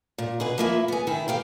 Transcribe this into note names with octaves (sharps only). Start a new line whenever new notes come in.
A#2
B2 G#4 B4
F3 A#3 E4
B3 G#4
D#3 E4
G4 F5 G5